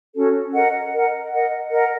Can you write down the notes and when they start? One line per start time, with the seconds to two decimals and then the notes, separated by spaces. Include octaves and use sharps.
0.14 C#4 F#4 A4
0.53 A#4 D#5 F#5
0.93 A#4 D#5 F#5
1.32 A#4 D#5 F#5
1.71 A#4 D#5 F#5